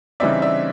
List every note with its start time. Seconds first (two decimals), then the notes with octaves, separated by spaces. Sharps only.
0.20 C#3 E3 G3 C4 D#4 D5 E5
0.42 D5 E5